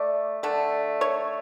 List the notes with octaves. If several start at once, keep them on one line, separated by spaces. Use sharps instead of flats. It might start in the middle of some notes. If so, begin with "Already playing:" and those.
Already playing: A3 D5
D3 A3
C#5